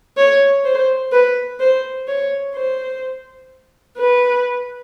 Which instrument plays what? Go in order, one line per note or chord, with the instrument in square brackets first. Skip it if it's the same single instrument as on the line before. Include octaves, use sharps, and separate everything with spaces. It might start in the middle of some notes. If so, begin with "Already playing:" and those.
[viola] C#5
C5
B4
C5
C#5
C5
B4